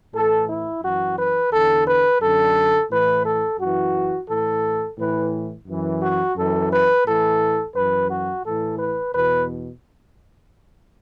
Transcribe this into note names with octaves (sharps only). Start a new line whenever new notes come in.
A2 E3 A4
E4
F#2 E3 F#4
B4
E2 D3 A4
B4
F#2 D3 A4
A2 E3 B4
A4
F#2 E3 F#4
A2 E3 A4
A2 E3 B4
F#2 E3
F#4
F#2 E3 A4
B4
A2 E3 A4
F#2 E3 B4
F#4
A2 E3 A4
B4
E2 B2 B4